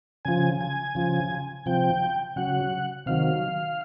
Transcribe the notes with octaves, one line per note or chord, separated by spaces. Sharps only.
C#3 F3 G#5
G#5
C#3 F3
C3 F3 G5
C#3 F#3 F#5
C3 D#3 F#3 F5